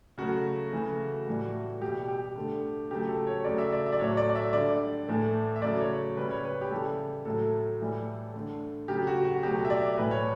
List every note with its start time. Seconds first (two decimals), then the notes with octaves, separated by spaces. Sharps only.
0.18 C#3 F#3 A3 F#4
0.72 C#3 E3 A3
1.27 A2 E3 G3
1.81 B2 G3 G4
2.08 G4
2.36 D3 A3
2.91 C#3 F#3 A3 G4
3.09 A4
3.27 C#5
3.44 C#3 F#3 A3 D5
3.58 E5
3.72 D5
3.86 E5
3.92 D5
3.99 A2 F#3 A3 C#5
4.17 D5
4.30 D5
4.35 E5
4.53 D3 G3 D5
5.08 A2 E3 A3
5.56 E5
5.62 C#3 F#3 A3 D5
5.80 C#5
6.17 C#3 G3 B4
6.31 C#5
6.45 B4
6.61 G4
6.71 C#3 E3 G3 A4
7.25 A2 F#3 A3 A4
7.80 A2 E3 G3
8.34 D3 A3
8.88 C#3 F#3 A3 G4
9.07 F#4
9.25 F#4
9.43 B2 F#3 A3 G4
9.65 E5
9.70 D5
9.97 A2 E3 G3 B4
10.11 C#5